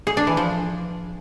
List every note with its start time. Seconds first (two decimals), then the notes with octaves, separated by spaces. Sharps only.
0.07 G#4
0.17 D4
0.27 E3
0.37 F3